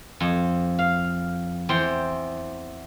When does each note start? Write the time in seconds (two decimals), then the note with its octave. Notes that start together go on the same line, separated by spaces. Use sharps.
0.20 F2
0.79 F5
1.69 E2 C5 G5